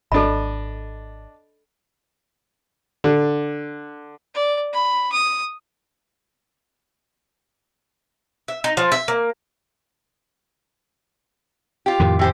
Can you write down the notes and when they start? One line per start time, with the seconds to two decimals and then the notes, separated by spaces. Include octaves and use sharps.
0.12 G#1 D4 A4 D#5 B5
3.04 D3
4.35 D5
4.73 B5
5.12 D#6
8.48 E5
8.64 D#4
8.77 F3
8.92 E5
9.08 A#3
11.86 F4 G4
11.99 F2 A2 D#3
12.19 E3 G4 C5